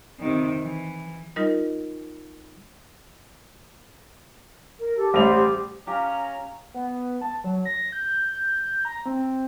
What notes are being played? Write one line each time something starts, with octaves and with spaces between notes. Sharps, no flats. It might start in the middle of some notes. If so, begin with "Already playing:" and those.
C3 D#3
E3
G3 D#4 F4 A#4 D#5
A#4
G4 A4
A1 G3 C5 F#5 F7
G4
C#4 G4 F5 A#5 F6
B3
A5
F#3
A#6
G6
G6
A#5
C4